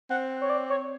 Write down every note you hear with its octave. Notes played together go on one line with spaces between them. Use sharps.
C4 F#5
C#5
D5
C#5